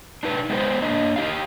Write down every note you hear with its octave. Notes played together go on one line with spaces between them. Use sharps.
D4 D#4 B4
G#3 B3 E4 F#4 B4 C5
A#3 D4 D#5
D#4 G4 D#5 F5